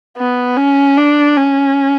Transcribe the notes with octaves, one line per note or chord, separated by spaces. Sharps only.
B3
C#4
D4
C#4